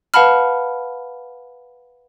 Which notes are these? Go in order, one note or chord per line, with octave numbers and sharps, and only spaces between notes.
B4 F5 F#5 A5 B5 F6